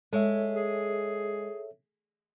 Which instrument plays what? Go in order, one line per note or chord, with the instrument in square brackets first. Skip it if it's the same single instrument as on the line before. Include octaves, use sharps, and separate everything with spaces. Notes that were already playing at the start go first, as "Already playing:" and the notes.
[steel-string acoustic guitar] G#3 [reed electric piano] A4 C#5 E5
[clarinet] G#4